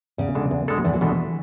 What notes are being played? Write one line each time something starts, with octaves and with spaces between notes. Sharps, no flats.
E2 C#3
B2 G#3 D4 A4
E2
B2 G#3 D4 A4
E2 E3
F#3
B2 E3 G#3 D4 A4